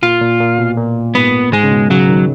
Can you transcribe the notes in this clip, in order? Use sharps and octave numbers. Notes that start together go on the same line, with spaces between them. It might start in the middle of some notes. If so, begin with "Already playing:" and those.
A#2 F4
A#2
A#2
B2
A#2
G#2 B3
G#2 G#3
C#3
B2
C#3 F#3
D#3